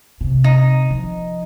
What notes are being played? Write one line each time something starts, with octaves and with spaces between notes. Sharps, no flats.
C3
D#4
F3